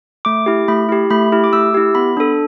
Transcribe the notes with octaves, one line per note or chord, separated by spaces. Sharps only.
A3 D6
E4 G4
A3 B5
E4 G4
A3 B5
E4 G4
D6
A3 E6
E4 G4
B3 B5
D4 A4